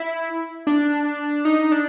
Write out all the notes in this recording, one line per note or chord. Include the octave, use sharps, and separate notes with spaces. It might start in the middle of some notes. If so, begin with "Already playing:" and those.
Already playing: E4
D4
D#4
D4